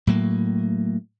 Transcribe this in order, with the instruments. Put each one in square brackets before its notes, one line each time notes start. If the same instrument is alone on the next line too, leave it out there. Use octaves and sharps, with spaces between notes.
[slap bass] A2 F#3 A#3